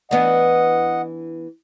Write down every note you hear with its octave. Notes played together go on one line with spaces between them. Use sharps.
E3 B3 D4 D#5 F#5